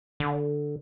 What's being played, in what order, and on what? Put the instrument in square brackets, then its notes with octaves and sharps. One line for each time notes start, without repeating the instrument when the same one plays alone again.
[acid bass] D3